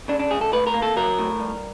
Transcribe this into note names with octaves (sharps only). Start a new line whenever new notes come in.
C#3 D4
D4
C#2 G#4
A4
A2 B4
A#4
A#3
A4
F#3 A#4
A2
G2